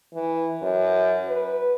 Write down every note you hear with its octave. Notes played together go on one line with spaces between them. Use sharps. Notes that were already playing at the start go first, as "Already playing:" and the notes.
E3
F#2
B4